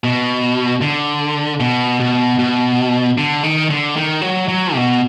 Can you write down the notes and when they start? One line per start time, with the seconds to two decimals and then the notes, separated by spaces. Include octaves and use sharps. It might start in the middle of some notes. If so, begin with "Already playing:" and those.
0.04 B2
0.81 D3
1.60 B2
2.00 B2
2.39 B2
3.18 D3
3.43 D#3
3.70 D3
3.96 D#3
4.22 F#3
4.48 F#3
4.75 B2